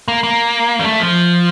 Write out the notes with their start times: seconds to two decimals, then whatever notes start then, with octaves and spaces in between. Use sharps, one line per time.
0.08 A#3
0.23 A#3
0.80 G3
0.84 A3
1.00 F3